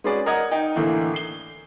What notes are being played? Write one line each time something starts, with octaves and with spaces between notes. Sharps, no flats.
G#3 C#4 F#4 G#4 B4 D5
A#4 D#5 F#5 D#6 G#6
D#4 G5
A2 D3 E3 A#3
C7 G7